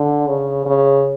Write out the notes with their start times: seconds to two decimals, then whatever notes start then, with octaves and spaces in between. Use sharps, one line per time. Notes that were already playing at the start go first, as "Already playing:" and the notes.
Already playing: D3
0.27 C#3
0.66 C#3